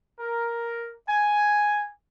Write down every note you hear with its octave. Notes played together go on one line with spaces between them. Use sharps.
A#4
G#5